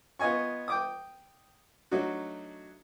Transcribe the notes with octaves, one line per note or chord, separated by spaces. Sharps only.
B3 F4 D#5 G#5 C#6
G5 D6 D#6
F#3 A3 D4 D#4 F#4